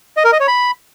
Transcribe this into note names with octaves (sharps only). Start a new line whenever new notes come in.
D#5
A#4
D#5
C#5
B5